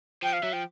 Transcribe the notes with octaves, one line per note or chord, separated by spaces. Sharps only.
F3 G5
F5
F#3 E5
F3 G5